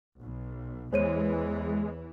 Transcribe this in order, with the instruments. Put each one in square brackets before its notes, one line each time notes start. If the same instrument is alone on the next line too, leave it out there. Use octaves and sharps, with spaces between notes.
[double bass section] B1
[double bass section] E2 E3 [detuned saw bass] G#3 [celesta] C5 C#5 D#7